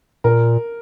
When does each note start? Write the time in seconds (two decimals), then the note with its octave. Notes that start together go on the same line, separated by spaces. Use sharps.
0.24 A#2 A#4